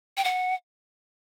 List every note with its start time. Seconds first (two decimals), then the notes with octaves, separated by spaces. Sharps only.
0.17 G5
0.24 F#5